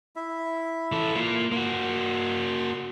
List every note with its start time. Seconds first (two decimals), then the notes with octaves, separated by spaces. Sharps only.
0.16 E4 E5
0.92 E3 A4
1.16 A#3 F4
1.52 A#3 F#4 C6